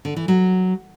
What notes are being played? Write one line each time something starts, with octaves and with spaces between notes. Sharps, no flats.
D3
E3
F#3